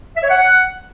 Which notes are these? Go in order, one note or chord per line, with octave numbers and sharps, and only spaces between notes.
E5
C#5
F#5